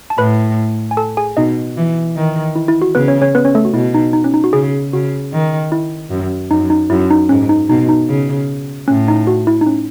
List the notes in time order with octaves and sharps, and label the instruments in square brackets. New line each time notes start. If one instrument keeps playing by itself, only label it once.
[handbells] A5
[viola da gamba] A2 [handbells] B4 B5
[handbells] G#5
A4 A5
G#4 G#5
[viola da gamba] B2 [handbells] D#4 D#5
[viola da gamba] E3
D#3
[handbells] E4
E4
F#4
[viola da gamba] C#3 [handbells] B3 B4
[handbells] C#4 C#5
C#4 C#5
B3 B4
C#4 C#5
A3 A4
F#4
[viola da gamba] B2 [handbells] E4
[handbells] D#4
D#4
C#4
D#4
F#4
[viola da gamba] C#3 [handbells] G#4
[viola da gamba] C#3 [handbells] F#4
[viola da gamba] D#3
[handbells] E4
[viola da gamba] F#2
[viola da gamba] F#2 [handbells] D#4
[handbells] D#4
[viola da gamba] F#2 [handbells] E4
[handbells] D#4
[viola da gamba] G#2 [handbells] C#4
[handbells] D#4
[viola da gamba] B2 [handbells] D#4
[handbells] D#4
[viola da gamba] C#3
[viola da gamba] A2 [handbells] C#4
[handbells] D#4
F#4
E4
D#4
C#4